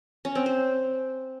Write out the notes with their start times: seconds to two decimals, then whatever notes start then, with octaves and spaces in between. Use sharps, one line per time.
0.25 C#4
0.35 C4
0.46 C5